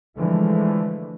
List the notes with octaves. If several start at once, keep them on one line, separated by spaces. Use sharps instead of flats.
D3 E3 F3 G#3 A3